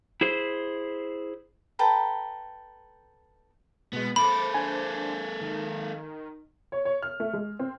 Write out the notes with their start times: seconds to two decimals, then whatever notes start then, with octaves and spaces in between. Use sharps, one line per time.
0.21 E4 G#4 C5
1.79 A4 B4 G5 A#5
3.93 B2 G#3 B3
4.16 A#3 A4 C5 B5 D6 A6
4.54 D4 C5 G#5
5.41 D#3
6.72 C#5
6.85 C#5
7.02 F6
7.20 A3
7.33 G#3
7.59 C4